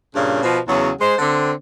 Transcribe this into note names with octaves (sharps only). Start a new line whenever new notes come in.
G2 A#2 C#3
B2 F3
E2 C#3 F#3
G#3 C5
D3 C4